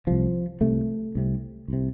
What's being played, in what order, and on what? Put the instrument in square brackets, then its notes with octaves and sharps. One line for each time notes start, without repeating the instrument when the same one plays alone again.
[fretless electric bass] C2 C3 F3
C2 C3 A3
C2 C3
C2 C3